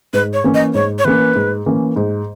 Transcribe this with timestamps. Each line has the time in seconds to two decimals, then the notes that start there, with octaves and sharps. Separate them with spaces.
0.13 G#2 B4
0.33 C#5
0.44 E3 A#3 C#4
0.54 D#5
0.74 G#2 C#5
0.99 C#5
1.05 E3 A#3 C#4 B4
1.35 G#2
1.66 E3 A#3 C#4
1.96 G#2